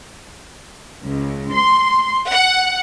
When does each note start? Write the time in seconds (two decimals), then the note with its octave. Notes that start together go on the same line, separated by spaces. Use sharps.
1.02 C#2
1.53 C6
2.31 F#5